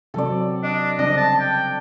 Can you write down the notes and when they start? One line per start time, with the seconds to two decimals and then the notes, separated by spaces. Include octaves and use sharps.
0.14 C3 F#3 C4 A4 D5
0.63 D4 D#5
0.99 C#3 G3 C4 D4 D#5
1.17 A5
1.40 G5